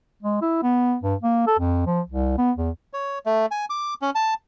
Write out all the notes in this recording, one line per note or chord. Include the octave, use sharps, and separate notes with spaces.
G#3
E4
B3
G2
A#3
A4
F2
F3
C2
B3
E2
C#5
A3
G#5
D6
C#4
A5